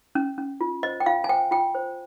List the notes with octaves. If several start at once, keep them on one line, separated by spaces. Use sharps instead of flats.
C#4
C#4
F4
C5 D#5
G5
F4 F5
G#5
C5 G5
F4 G5
C5